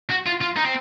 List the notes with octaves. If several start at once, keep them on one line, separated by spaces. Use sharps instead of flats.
F#4
F4
F4
D#4
C4